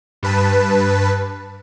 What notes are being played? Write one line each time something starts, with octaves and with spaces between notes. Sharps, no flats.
G2 B4 A5